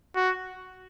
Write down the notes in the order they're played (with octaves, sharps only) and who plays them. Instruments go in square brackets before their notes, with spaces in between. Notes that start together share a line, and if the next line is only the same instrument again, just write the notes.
[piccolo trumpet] F#4